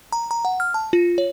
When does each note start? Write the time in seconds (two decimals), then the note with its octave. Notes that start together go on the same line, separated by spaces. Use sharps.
0.13 A#5
0.31 A#5
0.45 F#5
0.60 F6
0.74 A5
0.93 F4
1.18 C#5